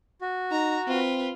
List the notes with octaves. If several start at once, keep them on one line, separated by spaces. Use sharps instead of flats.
F#4
D#4 A#5
C4 F4 B4